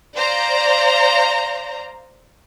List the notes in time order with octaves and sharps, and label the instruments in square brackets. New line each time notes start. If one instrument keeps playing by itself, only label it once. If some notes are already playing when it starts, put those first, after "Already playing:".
[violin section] C5 D5 F5 A#5